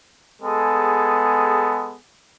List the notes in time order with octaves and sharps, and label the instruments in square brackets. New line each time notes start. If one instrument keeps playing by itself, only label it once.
[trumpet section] G#3 B3 G#4 A4